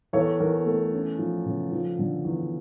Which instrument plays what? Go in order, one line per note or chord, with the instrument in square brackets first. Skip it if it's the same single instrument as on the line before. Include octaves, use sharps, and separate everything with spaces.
[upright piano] E2 A4 C#5
E2 A#4
A3 A4
C#4
F3
C#3
F3
D3
E2